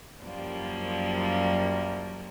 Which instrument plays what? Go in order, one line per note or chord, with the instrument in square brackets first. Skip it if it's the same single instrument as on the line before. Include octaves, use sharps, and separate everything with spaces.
[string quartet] F#2 F3 G3 A#3